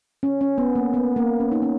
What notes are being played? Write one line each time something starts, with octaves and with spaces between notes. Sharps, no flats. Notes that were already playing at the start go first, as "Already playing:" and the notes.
C#4
C#4
B3
A#3
B3
A#3
C#4
D#4
C#4